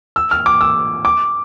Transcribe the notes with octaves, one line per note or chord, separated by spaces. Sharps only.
E6
F6
D6
E6
D6